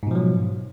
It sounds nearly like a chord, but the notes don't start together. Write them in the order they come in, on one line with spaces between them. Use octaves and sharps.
G#2 B2 F3 F#3